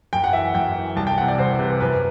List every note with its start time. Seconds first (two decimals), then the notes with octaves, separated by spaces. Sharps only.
0.13 F#2 G5
0.24 F#5
0.33 E3 E5
0.55 F#2 G5
0.75 E3
0.96 C2 A5
1.07 G5
1.17 E3 F#5
1.21 C3
1.28 D5
1.38 C2 C5
1.59 C3 E3 B4
1.80 F#2 B4